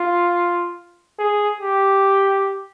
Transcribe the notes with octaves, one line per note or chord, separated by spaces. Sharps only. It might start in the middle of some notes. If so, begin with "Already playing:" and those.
Already playing: F4
G#4
G4